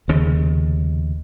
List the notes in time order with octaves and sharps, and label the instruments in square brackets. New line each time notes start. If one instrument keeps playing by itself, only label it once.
[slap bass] F1 D#2 C#3